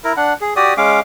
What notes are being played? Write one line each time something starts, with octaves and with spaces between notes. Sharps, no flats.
E4 A#4
D4 F#5
G#4
F#4 G4 D5 D#6
G#3 C#4 F5 D6